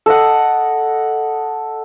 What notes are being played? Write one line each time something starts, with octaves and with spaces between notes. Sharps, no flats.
A4 D#5 F#5